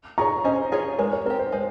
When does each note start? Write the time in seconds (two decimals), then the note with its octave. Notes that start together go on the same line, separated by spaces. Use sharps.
0.18 F4 G#4 C#5 A#5 C#6
0.44 C#4 C5 D#5
0.72 F4 G#4 C#5
0.99 G#3 A#4 C#5
1.12 A#4 C#5
1.26 C4 G4 A#4 C#5
1.39 C5
1.52 G#3 C5